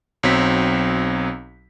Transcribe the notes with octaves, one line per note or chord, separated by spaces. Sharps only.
B1 F#3 C4 B6